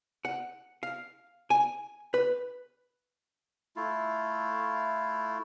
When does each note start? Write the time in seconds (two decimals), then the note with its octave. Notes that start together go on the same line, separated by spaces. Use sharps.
0.25 F#5
0.83 F5
1.50 G#5
2.14 B4
3.76 A3 E4 F4